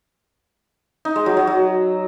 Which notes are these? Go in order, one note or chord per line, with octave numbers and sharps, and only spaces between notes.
D#4
G#3
F#3
F#3
F#3